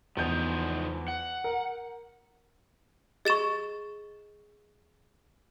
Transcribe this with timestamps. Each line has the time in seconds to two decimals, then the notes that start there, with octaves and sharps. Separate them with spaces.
0.17 E2 F3 D#4 G6
1.08 F#5
1.44 A#4
3.25 G#4 D#5 C#6 A6 E7